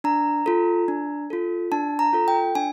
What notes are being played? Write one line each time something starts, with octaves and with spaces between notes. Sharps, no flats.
D4 A#5
F4 A4
D4
F4 A4
D4 A5
A#5
F4 A4
G5
D4 G#5